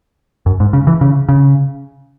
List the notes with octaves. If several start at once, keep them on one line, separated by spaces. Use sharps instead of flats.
F#2
G#2
C#3
E3
C#3
C#3